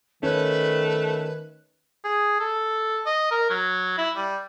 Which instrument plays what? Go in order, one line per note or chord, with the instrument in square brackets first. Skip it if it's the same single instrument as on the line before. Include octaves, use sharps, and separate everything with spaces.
[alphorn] D#3 [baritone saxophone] A3 [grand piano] C#4 [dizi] B4
[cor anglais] G#4
A4
D#5
A#4
F#3
E4
G3